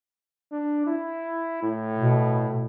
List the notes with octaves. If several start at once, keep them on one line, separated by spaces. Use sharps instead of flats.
D4
E4
A2
B2